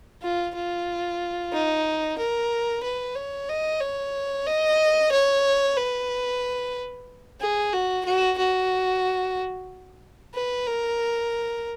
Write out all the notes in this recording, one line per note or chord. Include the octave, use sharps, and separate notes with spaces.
F4
F4
D#4
A#4
B4
C#5
D#5
C#5
D#5
C#5
B4
G#4
F#4
F#4
F#4
B4
A#4